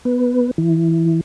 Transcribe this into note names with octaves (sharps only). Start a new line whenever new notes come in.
B3
E3